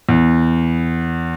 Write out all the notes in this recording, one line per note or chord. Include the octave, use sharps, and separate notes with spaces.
E2